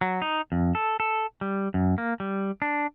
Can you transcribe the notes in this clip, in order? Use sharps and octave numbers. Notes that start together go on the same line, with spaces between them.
F#3
D#4
F2
A4
A4
G3
F#2
A#3
G3
D4